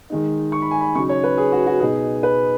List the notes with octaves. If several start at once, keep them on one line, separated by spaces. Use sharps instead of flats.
D#3 G#3 D#4
C#6
B5
G#5
B5
C#3 F#3 D#4 C#6
C#5
B4
G#4
F#4
F#4
B2 B3 D#4 G#4
B4